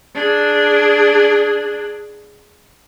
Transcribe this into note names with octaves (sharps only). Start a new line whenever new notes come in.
D4 G#4